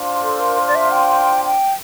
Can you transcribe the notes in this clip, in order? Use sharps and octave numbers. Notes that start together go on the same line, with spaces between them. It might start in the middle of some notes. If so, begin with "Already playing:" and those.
Already playing: D4 F4 C5 F5
A4
A#4
D5
E5
G5
G5